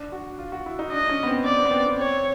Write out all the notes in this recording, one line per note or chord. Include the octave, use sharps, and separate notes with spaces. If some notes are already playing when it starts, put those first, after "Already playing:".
Already playing: D4
F#4
F4
F#4
E4
D#4
D4 D#5
C#4
B3
C4
B3 D5
C4
B3
C4
C4
C4 C#5